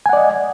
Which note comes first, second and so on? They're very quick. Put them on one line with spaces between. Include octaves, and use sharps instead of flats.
G#5 F#5 D5 D#5